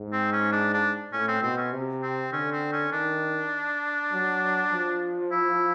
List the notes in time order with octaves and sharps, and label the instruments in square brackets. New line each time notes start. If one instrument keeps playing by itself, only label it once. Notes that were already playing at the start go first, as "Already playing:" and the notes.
Already playing: [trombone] G#2
[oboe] C4
C#4
D4
D4
[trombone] A2 [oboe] C#4
[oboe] C4
[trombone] B2 [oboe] C4
[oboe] C#4
[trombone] C3
[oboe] C4
[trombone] D3 [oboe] C#4
[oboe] C4
C#4
[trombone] D#3 [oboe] D4
[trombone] F#3
F3
[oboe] E4